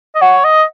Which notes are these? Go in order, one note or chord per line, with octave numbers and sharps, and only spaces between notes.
D#5
C#5 F#5
D#5